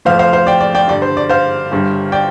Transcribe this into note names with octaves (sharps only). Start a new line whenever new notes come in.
F2 F3 A3 C5 F5
C5 F5
C5 F5
D5 G5
D5
D5 G5
G2 D3 G3 D5
C5
D5
C5 F5
G1 G2 G3
D5 G5